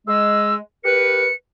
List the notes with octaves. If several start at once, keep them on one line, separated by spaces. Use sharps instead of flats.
G#3 E6
G4 A#4 B4 C#7